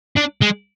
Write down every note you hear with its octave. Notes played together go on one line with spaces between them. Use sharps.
D4
G#3